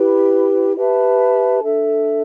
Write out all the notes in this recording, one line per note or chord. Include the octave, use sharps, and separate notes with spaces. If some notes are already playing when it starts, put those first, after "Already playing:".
Already playing: E4 G4 B4
G4 B4 E5 A5
D4 A4 E5